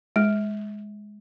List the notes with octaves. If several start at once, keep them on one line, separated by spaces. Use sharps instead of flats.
G#3